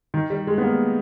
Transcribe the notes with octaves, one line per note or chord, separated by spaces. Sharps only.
D#3
G3
G#3
B3
A#3